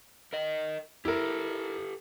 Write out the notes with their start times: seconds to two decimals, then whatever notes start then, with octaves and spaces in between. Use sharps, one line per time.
0.33 A#4 D#5
1.05 E4 G4 A4 A#4